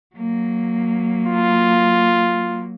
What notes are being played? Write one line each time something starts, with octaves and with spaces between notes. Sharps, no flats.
F#3 A#3
F4